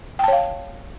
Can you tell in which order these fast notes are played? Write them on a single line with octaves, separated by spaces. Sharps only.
G5 A5 C#5 F5